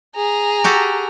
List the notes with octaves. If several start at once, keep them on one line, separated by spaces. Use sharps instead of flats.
G#4 A#5
F#4 G4 A4